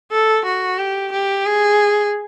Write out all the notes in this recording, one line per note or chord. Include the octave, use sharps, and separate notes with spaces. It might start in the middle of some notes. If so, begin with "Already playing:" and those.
A4
F#4
G4
G4
G#4